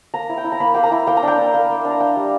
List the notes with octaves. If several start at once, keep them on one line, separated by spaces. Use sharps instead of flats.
A#3 A#5
E4
G5
E4
A#5
A#3 B5
A#3 G5
A#5
E4
A#3 G5
A#5
D4 G5
D4
A#3
A#3
D4
A#5
D4 G5
G3